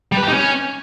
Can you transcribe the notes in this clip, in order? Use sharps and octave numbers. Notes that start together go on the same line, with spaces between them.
G3
B4
G4
D#4
C#4